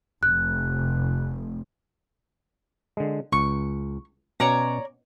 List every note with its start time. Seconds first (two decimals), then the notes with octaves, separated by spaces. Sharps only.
0.23 F1 F#6
2.97 D3 G#3
3.32 C#2 C#6
4.40 B2 C#4 F#4 C#5 D5 A#5